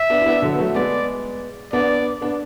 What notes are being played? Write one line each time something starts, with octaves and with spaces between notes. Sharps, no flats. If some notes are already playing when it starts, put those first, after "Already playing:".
Already playing: E5
B3 D4
E4
B3 D4
D3 F#3
B3
F#3 A3
G#3 B3 D5
B3 D4 D5
B3 D4